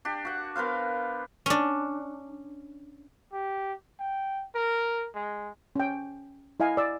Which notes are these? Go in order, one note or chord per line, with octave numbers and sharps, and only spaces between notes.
D4 G4
F#4 F#5
B3 A#4 C5 F5
C#4 D4
G4
G5
A#4
G#3
C#4 G5
E4 D#5 F5 G#5
D5 E6